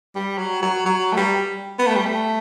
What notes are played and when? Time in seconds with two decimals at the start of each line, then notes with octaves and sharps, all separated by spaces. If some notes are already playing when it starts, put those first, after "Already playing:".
0.15 G3
0.38 F#3
0.62 F#3
0.85 F#3
1.12 A3
1.16 G3
1.79 B3
1.87 A3
1.96 G3
2.05 A3